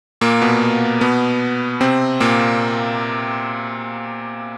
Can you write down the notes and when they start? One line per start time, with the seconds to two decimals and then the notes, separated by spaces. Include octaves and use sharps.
0.21 A#2 A#3
0.42 B2 B3
1.01 B2 B3
1.81 C3 C4
2.20 A#2 A#3